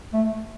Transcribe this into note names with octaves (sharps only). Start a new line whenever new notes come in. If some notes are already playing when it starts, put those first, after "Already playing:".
A3